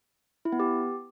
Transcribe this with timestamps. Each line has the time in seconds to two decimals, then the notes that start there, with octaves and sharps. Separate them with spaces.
0.45 E4
0.52 B3
0.60 G4